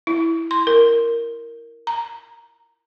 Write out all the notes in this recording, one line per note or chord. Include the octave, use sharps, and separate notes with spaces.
E4
C6
A#4
A#5